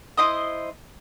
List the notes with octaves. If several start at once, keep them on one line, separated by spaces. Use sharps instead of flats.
E4 C5 D#5 D#6